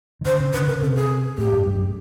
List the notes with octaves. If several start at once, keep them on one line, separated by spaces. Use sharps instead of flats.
D#3
D3 C5
C#3
D3 B4
C#3 A#4
C3 A4
G#4
A2 G4
G2
G2
F#2